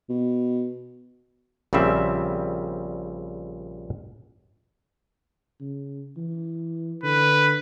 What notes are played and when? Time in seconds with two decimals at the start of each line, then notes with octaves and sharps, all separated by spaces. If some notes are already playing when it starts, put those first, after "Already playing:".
0.09 B2
1.73 A#1 C#3 G3 C4 E5
5.60 C#3
6.17 E3
7.03 D3 B4